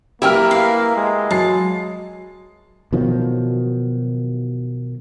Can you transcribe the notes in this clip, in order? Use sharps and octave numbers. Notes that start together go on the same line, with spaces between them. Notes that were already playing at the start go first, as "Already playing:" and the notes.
A#3 E4 G4 A#4 B4 G5 F6
F5
G#3
F#3 A5 C7
B2 D#3 F3 F#3